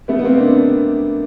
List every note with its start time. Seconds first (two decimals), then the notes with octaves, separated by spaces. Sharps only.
0.08 A3 B3
0.19 B3
0.24 A#3 C4
0.40 C4 D4